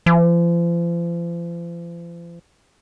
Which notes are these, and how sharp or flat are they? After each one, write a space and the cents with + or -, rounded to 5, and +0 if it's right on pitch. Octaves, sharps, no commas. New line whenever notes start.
F3 -40